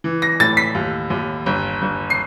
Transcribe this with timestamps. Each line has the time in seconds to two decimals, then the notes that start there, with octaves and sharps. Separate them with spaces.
0.04 E3
0.22 A#6
0.40 A2 A6
0.57 B6
0.75 D#2
1.10 D#2
1.46 G1
1.82 G1
2.10 C7